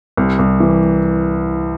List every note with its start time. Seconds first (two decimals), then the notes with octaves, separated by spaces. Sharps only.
0.17 C2
0.39 C2
0.60 E3